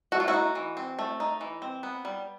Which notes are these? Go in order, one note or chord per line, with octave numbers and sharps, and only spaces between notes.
A3 F#4
F4
E4 F#4
D#4
E3
C4
A3
D#4
E3
C4
B3
G3